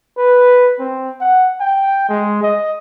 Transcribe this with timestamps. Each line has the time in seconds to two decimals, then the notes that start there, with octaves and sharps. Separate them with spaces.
0.17 B4
0.79 C4
1.20 F#5
1.61 G5
2.09 G#3
2.43 D#5